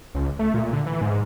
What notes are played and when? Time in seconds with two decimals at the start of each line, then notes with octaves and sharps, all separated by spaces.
0.15 C#2
0.39 A3
0.54 A#2
0.73 D3
0.86 E3
1.01 G#2